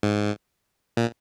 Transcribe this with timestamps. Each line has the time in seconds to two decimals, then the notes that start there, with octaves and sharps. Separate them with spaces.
0.03 G#2
0.97 A#2